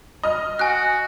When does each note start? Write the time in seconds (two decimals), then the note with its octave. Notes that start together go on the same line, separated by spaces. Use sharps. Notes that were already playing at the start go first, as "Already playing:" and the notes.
0.23 D#5 F6
0.59 F#4 G#5 F#6